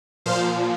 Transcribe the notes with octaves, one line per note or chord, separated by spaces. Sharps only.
A#2 F3 C5 F5